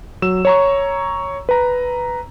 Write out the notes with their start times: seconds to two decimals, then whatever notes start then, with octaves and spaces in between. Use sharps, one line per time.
0.22 F#3 E6 E7
0.45 C#5 A#5 C#6
1.49 B4 A#5